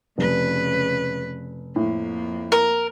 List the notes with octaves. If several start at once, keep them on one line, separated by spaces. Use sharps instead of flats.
F1 C#3 B4
F2 A2 A#3
A#4